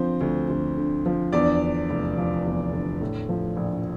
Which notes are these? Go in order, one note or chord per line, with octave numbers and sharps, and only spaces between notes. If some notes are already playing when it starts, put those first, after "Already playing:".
Already playing: D3 F3 C4 C5
D2
D2
D3
F3
E2 D4 D5
D3
F1
F3
E2
D3
A2
F3
A#1